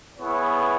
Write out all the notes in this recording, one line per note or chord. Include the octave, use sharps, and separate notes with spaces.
B3 E4 G#4 C#5